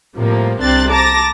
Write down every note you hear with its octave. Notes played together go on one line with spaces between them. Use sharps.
A2 C3 F3 G3 A#3
C2 C3 C4 D4 F#6 A6
A5 A#5 D6 A6 A#6